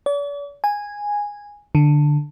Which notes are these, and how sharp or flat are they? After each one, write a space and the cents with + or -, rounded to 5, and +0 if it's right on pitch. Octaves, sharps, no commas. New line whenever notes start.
D5 -45
G#5 -10
D3 +10